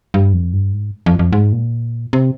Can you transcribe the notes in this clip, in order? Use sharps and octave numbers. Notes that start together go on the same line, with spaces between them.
G2
F2
G2
G#2
F2
F2
G#2
A#2
C3